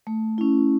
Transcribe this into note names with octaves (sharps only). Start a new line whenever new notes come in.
A3
C#4 E4